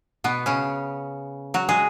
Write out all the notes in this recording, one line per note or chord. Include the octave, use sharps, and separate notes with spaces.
B2 B3
C#3 C#4
F#3 F#4
G#3 G#4